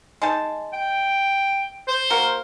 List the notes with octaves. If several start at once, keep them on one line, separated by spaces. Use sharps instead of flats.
G#3 D#4 A5
G5
C5
A#3 F#4 A#4